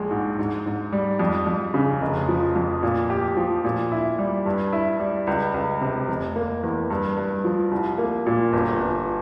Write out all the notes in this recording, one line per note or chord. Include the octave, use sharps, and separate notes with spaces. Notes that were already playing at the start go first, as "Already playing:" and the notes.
Already playing: A#1 G#3
G#2
G#2
G#2
G3
F2
F2
C#3
F1
F3
F2
A#2
G4
F3
A#2
E4
G3
G2
E4
G3
C#2
C#2
C3
F1
A#3
E2
G2
G2
F3
C2
A#3
A#2
G1
G1